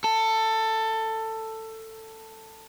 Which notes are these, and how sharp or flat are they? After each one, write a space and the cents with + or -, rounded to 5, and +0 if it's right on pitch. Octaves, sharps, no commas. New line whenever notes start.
A4 +15